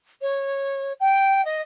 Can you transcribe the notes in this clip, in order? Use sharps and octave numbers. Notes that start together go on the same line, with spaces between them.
C#5
G5
D#5